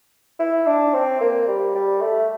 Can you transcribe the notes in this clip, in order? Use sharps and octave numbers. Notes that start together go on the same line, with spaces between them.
E4
D4
C4
A#3
G3
G3
A3